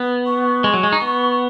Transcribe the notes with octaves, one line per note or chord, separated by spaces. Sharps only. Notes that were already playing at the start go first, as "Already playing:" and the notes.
Already playing: B3
C#6
G#3
F#3
G#3
D#4
B3